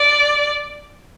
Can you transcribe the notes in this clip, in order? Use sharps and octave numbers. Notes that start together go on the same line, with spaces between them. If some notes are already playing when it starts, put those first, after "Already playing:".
Already playing: D5